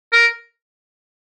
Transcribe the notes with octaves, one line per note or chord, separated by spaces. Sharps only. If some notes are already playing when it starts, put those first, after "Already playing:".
A#4